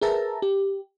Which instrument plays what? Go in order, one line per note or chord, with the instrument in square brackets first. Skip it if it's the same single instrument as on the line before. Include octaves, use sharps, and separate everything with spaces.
[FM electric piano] G#4 A#4 B4 E5 A5 A#5
G4